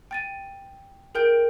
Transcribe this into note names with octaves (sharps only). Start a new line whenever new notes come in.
G5 A6 D#7
G#4 A#4 G5 G6 D7